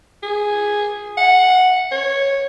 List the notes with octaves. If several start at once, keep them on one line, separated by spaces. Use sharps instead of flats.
G#4
F#5
C#5